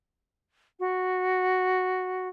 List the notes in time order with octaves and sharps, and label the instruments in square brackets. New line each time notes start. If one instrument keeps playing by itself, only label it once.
[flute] F#4